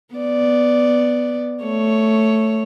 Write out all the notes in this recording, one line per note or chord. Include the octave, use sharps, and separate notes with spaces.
B3 D5
A3 C#5